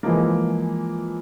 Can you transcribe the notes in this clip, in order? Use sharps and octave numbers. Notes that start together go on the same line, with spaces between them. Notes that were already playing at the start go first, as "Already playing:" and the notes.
E3 F3 G#3 A#3